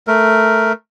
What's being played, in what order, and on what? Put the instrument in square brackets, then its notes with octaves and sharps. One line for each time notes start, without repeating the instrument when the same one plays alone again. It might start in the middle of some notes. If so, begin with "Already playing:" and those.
[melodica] A3 A#4